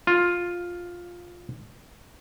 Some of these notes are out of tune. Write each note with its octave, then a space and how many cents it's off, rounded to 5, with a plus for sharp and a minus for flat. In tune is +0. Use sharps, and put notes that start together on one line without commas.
F4 +10